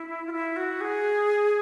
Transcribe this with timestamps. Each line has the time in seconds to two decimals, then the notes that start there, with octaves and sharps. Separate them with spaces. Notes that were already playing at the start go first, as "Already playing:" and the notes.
Already playing: E4
0.26 F4
0.32 E4
0.56 F#4
0.81 G#4